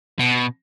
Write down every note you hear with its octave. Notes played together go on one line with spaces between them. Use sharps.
B2